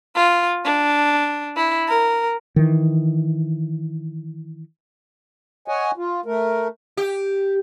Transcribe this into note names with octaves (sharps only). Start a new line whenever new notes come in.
F4
D4
E4
A#4
D#3 E3
C#5 D#5 F#5 G#5
F4
A3 A#4
G4